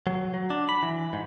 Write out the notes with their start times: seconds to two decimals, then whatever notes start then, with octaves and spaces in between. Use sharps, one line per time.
0.07 F#3
0.34 F#3
0.50 D4
0.69 B5
0.83 E3
1.13 G#2